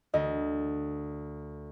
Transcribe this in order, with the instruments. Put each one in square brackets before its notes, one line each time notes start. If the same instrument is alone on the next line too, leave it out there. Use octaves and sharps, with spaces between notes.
[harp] D2 [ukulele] D#5